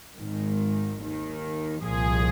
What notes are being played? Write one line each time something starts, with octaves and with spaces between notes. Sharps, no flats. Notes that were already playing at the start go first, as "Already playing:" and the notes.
G#1 G#2 D#3
D#2 D#3
C2 A#2 F3 G#4